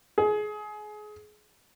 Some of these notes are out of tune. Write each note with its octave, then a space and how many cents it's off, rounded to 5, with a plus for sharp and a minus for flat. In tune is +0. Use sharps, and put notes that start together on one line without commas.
G#4 +25